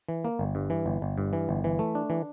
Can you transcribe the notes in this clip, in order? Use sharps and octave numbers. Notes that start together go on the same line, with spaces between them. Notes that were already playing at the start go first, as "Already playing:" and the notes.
E3
A#3
G1
G2
E3
G1
G1
G2
E3
G1
E3
A3
D4
E3